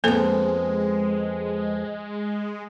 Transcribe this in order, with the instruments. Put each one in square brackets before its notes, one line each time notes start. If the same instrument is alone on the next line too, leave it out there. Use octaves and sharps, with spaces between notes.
[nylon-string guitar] F2 B3 [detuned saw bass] G#3 [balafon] A#3 A4 C5